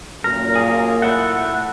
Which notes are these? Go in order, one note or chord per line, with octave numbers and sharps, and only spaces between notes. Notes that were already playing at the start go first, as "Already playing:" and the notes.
F#2 A#2 A#4
F4 G#4
A3 E4 F#5